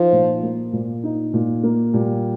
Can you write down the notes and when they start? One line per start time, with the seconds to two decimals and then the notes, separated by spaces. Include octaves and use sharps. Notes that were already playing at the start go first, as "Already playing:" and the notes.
Already playing: F3 D#4
0.12 A#2
0.43 A#3
0.73 A#2
1.03 D#4
1.34 A#2
1.63 A#3
1.93 A#2 G3